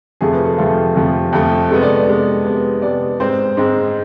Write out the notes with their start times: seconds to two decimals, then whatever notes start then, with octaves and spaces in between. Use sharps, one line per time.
0.21 F2 C3 F3 A3 G#4
0.33 B4
0.45 A4
0.58 F2 C3 F3 A3 F4
0.96 F2 C3 F3 A3
1.33 F2 C3 F3 A3
1.70 C3 G#3 B3 A4
1.83 D5
1.95 D5
2.07 C3 G#3 B3
2.45 C3 G#3 B3
2.82 C3 G#3 B3 D5
3.20 G#2 G#3 C4 C5
3.57 G#2 G#3 C4